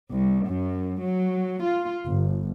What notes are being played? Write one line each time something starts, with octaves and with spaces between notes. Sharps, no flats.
C2
F#2
F#3
F4
G1